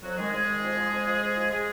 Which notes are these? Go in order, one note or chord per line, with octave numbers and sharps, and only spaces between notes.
F2 F#3 F#4
D#3 G#3 G#4
F2 G#3 G#4
D#3
F2
F3
F2
F3
G#2
F3
G#3 G#4